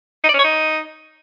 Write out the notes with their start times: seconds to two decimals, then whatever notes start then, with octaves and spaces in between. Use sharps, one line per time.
0.24 D#4
0.29 D5
0.34 C#4
0.39 C#5
0.44 D#4